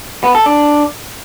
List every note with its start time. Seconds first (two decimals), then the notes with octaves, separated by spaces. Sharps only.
0.24 B3
0.35 A4
0.46 D4